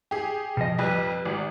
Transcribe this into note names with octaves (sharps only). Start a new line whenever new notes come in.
G4 G#4
B2 F3 D#5
F2 G3 G4 B4
G#1